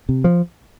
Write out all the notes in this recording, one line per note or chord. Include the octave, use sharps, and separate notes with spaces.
C3
F3